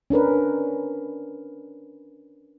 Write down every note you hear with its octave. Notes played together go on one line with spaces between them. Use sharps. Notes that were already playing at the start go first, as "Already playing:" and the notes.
C#4 D4 A#4 B4